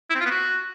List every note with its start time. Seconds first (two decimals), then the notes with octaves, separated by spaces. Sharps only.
0.10 E4
0.15 C4
0.20 F4
0.26 B3
0.31 F#4